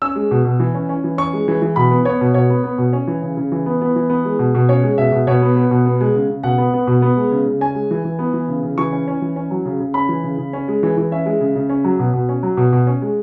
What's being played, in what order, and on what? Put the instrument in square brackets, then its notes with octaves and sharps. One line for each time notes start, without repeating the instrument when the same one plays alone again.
[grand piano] C#4 E6
G#3
B2
B2
E3
C#4
C#4
E3
C#4 C#6
G#3
E3
E3
B2 B5
B3
B3 C#5
B2
B2 C#5
B3
B3
B2
C#4
E3
C#3
C#3
E3
B3
B3
E3
B3
G#3
B2
B2
C#4 C#5
G#3
B2 E5
B2
B2 C#5
B3
B3
B2
B3
G#3
C#3
C#3
B2 F#5
B3
B3
B2
B3
G#3
C#3
C#3
C#4 G#5
G#3
E3
E3
B3
E3
C#3
C#3
E3 C#6
C#4
C#4
E3
C#4
F#3
C#3
C#3
C#4 B5
E3
C#3
C#3
C#4
G#3
E3
E3
C#4 E5
G#3
C#3
C#3
C#4
F#3
B2
B2
C#4
F#3
B2
B2
C#4
G#3